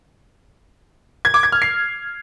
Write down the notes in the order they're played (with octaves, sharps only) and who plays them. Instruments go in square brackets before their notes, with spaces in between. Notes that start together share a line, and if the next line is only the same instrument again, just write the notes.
[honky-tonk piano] G#6
D6
G#6
F6
C7